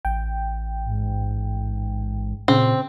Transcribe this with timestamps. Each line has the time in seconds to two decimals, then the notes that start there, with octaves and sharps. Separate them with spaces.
0.05 A1 G5
0.85 G#2
2.48 A#2 C#3 C4